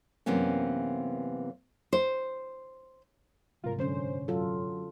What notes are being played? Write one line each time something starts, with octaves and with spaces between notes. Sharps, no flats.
F#2 C3 E3 A#3 B3 C#4
C5
G1 G#2 C3 F4 A#4
F#2 D3 C#4 C5
F#2 F#3 F4 A4